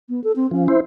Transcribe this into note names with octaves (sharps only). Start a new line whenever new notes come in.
B3
A4
C4
F3 C#4
E4 C5